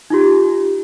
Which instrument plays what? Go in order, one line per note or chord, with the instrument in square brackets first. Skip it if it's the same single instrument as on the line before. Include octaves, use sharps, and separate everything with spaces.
[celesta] D#4 F4 G4